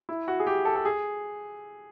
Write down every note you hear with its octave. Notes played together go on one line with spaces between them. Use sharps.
E4
F#4
G#4
G4
A4
A4
G#4